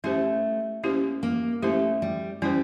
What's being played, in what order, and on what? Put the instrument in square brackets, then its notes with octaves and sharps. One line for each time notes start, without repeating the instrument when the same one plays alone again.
[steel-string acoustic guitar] A3 [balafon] C#4 E4 G4 C5
[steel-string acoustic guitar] A#3 [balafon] C#4 E4 G4 C5
[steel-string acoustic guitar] A#3
[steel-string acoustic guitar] A3 [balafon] C#4 E4 G4 C5
[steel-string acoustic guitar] G3
[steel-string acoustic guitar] G3 [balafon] C#4 E4 G4 C5